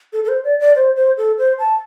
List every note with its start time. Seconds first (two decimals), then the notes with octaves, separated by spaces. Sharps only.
0.13 A4
0.24 A4
0.28 C5
0.44 D5
0.60 D5
0.76 C5
0.96 C5
1.18 A4
1.38 C5
1.59 A5